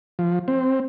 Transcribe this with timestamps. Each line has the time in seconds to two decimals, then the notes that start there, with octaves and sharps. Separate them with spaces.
0.19 F3
0.48 C4